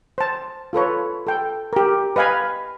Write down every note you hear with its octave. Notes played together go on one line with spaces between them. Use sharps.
C5 A5
F4 A4 B4 C#5
A4 G5
G4 A#4
B4 D#5 F5 G#5 B5